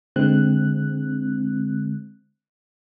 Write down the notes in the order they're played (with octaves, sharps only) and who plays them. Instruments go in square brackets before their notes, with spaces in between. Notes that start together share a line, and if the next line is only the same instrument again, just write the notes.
[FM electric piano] D3 G#3 C4 F#6